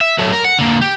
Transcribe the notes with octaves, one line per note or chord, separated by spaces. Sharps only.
E5
F#3 A3
A#4
F#5
D3 A#3
G4